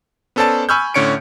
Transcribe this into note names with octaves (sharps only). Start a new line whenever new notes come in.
B3 C#4 A4 C5 D5 A5
G#5 B5 C#6 E6 F6 G6
A2 D3 C#4 C#5 C#7 D7